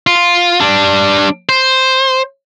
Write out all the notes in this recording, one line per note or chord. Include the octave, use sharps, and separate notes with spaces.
F4
G3 D4
C5